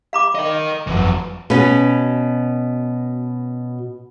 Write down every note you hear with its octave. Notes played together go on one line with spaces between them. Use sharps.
F5 B5 D6
A#4 D#5
G1 F2 E3 F#3
B2 C#4